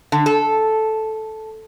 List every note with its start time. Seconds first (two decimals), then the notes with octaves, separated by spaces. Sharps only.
0.12 D3
0.26 A4